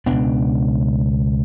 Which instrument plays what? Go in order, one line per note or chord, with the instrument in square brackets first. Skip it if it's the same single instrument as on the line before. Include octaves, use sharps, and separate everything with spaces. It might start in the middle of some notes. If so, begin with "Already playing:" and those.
[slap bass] C#2 B2 B3 D4